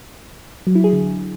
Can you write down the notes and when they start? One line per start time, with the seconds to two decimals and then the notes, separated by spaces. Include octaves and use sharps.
0.67 F#3
0.75 E4
0.84 G#4
0.93 D3